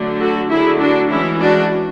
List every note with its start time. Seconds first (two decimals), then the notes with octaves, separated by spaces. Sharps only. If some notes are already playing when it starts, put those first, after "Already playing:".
Already playing: D3 F#3 A3 D4
0.19 F#4 A4
0.49 D3 F#3 A3 E4 G#4
0.80 D4 F#4
1.10 E3 G#3 C#4 E4
1.40 D4 F#4